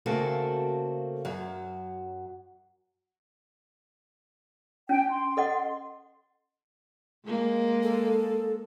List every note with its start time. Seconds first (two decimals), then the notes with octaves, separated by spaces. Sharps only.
0.06 C#3 A3 A#3 C4 F#4 A4
1.25 F#2 F#3
4.89 C#4 G5 G#5
5.10 C6
5.37 A4 D#5 F#5
7.26 G#3 A#3
7.83 A4